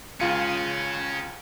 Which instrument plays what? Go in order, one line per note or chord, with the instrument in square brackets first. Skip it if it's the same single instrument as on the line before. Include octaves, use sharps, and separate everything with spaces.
[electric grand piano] C#2 F4 C#7 [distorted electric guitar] C#4 G#4